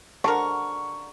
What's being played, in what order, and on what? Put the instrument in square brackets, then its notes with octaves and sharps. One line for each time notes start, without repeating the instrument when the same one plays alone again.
[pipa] D3 F#4 A#4 [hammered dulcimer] C#6